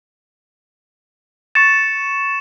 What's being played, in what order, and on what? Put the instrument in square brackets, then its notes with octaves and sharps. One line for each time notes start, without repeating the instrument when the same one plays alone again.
[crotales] C#6 C#7 E7 [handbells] A6